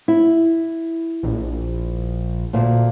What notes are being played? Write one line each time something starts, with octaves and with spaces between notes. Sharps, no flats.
E4
A#1
D2 A#2